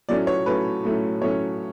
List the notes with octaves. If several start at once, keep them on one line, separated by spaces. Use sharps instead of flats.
A2 F#3 A3 C#4 D5
C#5
A2 F#3 A3 C#4 B4
A2 F#3 A3 C#4
A2 F#3 A3 C#4 C#5